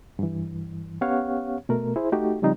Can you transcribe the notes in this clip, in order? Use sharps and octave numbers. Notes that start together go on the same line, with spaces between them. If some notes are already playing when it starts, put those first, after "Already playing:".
G2 E3
B3 C#4 G4 C#5 F5 F#5
B2 A3 A#4
E4 G#4 C5
A3 D#4 F#4 G4
C#3 F3 G3 C4 D#4